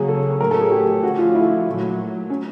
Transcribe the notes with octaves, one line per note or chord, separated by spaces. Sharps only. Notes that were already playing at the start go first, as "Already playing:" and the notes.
Already playing: C#3 F#3 A#3 C#4 G#4
A4
A2 F#3 A3 C#4 A#4
A4
G#4
G4
D3 F3 A3 C#4 F#4
F4
E4
A#2 F#3 A3
C#4